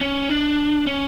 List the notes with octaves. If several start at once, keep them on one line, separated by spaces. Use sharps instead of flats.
C#4
D4
C#4